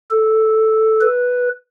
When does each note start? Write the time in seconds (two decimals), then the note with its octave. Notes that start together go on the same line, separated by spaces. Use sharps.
0.11 A4
1.01 B4